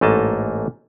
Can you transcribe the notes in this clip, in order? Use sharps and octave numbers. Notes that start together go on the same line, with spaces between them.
A1 G#2 A3 A#3 D#5 A5